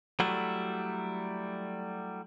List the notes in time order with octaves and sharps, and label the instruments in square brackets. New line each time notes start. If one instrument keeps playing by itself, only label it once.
[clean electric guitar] F#3 G3 A3 E4